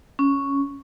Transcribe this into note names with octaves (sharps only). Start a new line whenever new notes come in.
C#4